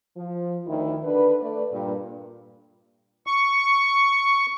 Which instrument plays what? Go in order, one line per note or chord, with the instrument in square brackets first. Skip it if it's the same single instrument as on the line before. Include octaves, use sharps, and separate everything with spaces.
[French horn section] F3
D2 D#3 E4
D3 B4
A3 B4 D5
G2 A#2
[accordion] C#6